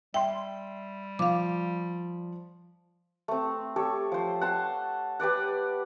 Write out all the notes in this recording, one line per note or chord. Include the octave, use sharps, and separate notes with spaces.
G3 E5 G5 C6
F3 F5 D6
A3 C4
G4 A4 C#5
F3 C5
F#5 A5 C6
G4 B4 D5 F#5